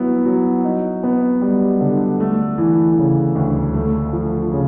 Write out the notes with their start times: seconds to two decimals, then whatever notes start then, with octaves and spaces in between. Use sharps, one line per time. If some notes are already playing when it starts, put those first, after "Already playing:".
Already playing: F#3 B3 E4
0.25 F#3
0.65 D#4
1.03 B3
1.41 G3
1.81 D3
2.20 A3
2.58 E3
2.98 C#3
3.35 D2
3.74 A3
4.13 F3
4.52 C#3